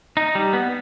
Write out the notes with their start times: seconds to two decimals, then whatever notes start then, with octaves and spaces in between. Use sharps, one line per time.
0.17 D#4
0.35 G3
0.53 B3